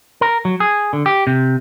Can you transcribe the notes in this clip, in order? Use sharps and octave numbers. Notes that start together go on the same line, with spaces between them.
A#4
F#3
G#4
D3
G4
C3